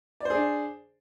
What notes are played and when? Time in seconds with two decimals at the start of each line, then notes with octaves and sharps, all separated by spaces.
0.20 D5
0.25 C5
0.30 G#4
0.35 D4